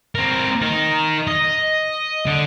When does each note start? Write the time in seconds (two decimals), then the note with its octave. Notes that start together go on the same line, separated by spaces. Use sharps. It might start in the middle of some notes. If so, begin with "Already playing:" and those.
0.15 C4 A#4
0.62 D#4 A#4
1.27 D#5
2.26 D3